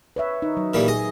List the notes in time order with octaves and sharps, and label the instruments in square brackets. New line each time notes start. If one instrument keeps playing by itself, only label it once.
[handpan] B4 C#5 E5
D#4
F#3
[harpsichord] A#2 E3 G3
[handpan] G#4 [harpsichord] D#5